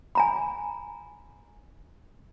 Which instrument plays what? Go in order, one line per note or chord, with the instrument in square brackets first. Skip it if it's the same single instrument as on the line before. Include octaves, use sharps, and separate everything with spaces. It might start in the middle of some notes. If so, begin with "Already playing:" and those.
[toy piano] G#5 A#5 B5